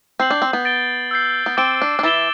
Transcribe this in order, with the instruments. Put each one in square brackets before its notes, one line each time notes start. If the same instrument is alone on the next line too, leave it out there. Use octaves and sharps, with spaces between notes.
[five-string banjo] C4 [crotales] G6 C7 F#7
[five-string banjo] D4
C4
B3
[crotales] A6 D7 G7
E6 G6 C7
[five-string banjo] B3
[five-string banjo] C4 [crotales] D6 A6 D7 G7
[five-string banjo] D4
D4
[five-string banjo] E3 E4 [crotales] A6 E7 G7